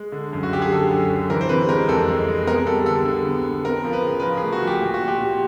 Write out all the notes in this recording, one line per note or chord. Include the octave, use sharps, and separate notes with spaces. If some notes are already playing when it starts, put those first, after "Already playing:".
Already playing: G#3
D3
F#2
F#4
D3 G4
G#4
D3 A4
F#2
D3
E3 A#4
C5
C3 B4
G#3 A#4
F2 A4
G#3
G#3
B3 A#4
G3 A4
D3 A4
D3
B3
B3
C4 A#4
F3
B4
C#3
B4
F3 A#4
G#4
A3
F#4
F3
G4
A#2 G4
F#4
A#2
G4
A#2